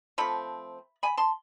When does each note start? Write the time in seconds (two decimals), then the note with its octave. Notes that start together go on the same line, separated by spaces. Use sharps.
0.18 F3 A3 C4 B5
1.03 G#5 B5
1.17 A5 C6